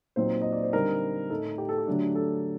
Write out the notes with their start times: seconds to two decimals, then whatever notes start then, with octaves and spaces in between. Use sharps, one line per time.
0.16 A#2 F#3 C4 D#4 C5
0.42 D#5
0.52 D5
0.63 C5
0.73 D3 G3 C4 D#4 A#4
1.30 A2 A3 D#4 A4
1.58 G4
1.69 A4
1.78 G4
1.87 D3 F#3 A3 D4
2.15 A4